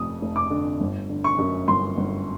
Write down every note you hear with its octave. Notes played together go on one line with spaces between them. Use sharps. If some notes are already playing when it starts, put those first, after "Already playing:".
Already playing: F1 F2 D#6
F1
D6
D3
G1
D3
C#6
F#2
G1 C6
G1